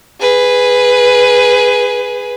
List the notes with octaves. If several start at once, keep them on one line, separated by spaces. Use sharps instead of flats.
G#4 B4